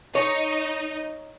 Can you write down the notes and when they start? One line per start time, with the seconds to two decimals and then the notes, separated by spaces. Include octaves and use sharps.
0.15 D#4 C#5